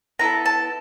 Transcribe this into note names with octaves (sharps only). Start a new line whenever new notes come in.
B3 E4 A4 A#5
A5